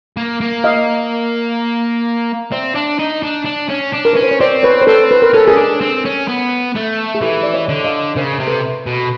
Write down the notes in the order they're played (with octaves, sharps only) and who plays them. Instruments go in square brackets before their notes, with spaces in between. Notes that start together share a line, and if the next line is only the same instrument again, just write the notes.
[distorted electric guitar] A#3
A#3
[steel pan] D#5 F5
[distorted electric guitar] C4 [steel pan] D5 E5
[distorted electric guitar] D4
D#4
D4
D4
C#4
D4
[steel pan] A#4
[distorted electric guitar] C#4 [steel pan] B4
[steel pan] C5
C#5
[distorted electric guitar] C4 [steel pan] C5 D5
[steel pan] B4 C#5
C5
[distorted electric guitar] C4 [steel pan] A4 B4
[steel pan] B4
A#4
[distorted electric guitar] C#4 [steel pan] A4
[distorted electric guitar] C#4 [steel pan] G#4 A#4
[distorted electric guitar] D4
C4
C#4
B3
A3
[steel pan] G#4
[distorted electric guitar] E3 [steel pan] G4 A4
[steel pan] D5
C#5 D#5
[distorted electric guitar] D3
[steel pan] D#5 F5
[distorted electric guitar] C#3 [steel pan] A#4 C5
[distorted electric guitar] C3
[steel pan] A4 B4
[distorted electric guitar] B2